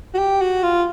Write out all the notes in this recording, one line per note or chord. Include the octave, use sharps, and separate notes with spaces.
F#4
G4
F#4
F4